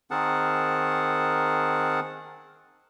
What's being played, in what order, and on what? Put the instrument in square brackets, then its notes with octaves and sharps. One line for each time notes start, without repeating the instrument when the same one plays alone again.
[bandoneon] D#3 C4 G#4 A#4 F#5 A5